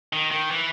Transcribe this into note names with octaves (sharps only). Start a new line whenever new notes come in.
D#3
D#3
E3